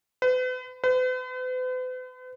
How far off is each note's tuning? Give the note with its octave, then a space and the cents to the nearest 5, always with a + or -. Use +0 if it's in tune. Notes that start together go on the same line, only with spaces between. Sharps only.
B4 +40
B4 +45